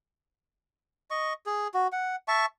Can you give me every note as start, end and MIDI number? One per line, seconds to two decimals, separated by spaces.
1.11 1.33 75
1.11 1.33 85
1.46 1.68 68
1.74 1.87 66
1.92 2.16 78
2.28 2.46 76
2.28 2.46 81
2.28 2.46 85